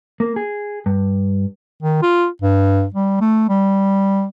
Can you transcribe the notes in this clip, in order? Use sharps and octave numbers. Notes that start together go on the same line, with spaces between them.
A#3
G#4
G2
D#3
F4
G2
G3
A3
G3